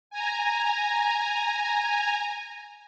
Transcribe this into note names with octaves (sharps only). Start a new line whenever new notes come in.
G#5 A#5